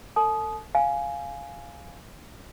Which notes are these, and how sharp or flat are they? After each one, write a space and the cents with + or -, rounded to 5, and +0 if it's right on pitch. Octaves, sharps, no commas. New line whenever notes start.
A4 +40 A5 -45 D#6 +0
F5 +0 G#5 +10